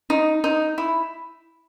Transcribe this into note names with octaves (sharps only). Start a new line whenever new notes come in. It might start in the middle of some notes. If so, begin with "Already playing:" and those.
D#4
D#4
E4